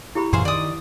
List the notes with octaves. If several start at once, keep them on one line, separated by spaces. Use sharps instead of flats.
E4 G4 B5
F#2 A#2 E3 G#4 C5 F5
D#3 D5 D#6